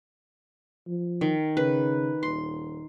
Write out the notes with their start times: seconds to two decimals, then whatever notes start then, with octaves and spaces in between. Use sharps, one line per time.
0.88 F3
1.21 D#3
1.57 C#3 B4
2.23 D#1 C6